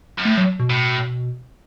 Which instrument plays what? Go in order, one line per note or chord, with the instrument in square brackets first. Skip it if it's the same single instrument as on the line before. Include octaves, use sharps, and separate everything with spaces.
[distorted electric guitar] F#2
[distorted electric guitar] A2 [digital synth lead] A3
[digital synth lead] F#3
B2
[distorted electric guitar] A2